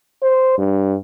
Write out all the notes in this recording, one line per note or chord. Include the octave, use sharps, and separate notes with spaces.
C5
G2